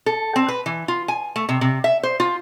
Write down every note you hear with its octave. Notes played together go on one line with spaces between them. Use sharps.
A4
C4
B4
E3
F4
G#5
A3
C3
C3
E5
C5
F4